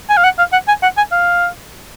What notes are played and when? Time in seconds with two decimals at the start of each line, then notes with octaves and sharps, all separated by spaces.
0.09 G#5
0.17 F5
0.24 F#5
0.38 F5
0.53 F#5
0.68 G#5
0.83 F#5
0.97 G#5
1.12 F5